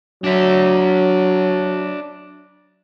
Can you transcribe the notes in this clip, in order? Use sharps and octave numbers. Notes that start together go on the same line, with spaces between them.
F#3 D4 E5